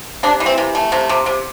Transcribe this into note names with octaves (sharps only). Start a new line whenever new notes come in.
C3 D4
E3
C4
C3
A3
C3
C3
C3